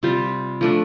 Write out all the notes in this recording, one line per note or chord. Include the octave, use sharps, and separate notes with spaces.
C3 G3 F4 C5
F3 A3 D4